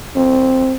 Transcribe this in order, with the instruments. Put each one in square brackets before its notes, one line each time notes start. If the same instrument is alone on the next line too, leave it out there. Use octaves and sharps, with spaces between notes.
[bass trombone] C4